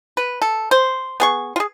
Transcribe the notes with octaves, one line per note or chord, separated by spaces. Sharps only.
B4
A4
C5
B3 G#4 C#6
F4 G#4